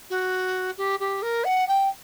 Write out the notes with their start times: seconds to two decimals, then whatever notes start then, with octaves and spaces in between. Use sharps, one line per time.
0.10 F#4
0.78 G4
1.00 G4
1.22 A#4
1.44 F#5
1.68 G5